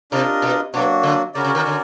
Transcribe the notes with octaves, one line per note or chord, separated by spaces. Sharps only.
C3 D4 F4 A#4 D#5
B2
B2 F#3 A#3 D4 F#4
D3
C#3 C#4 F#4 A#4 D5
C#3
D#3
D3